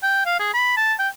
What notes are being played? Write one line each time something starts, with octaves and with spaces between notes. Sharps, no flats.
G5
F5
G#4
B5
A5
G5